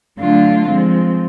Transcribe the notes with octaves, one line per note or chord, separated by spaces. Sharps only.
D3 F#3 A3 D4 F4
F3 G#3 C4